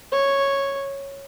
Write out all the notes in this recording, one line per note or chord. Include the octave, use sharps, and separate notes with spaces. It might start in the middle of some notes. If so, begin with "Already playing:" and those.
C#5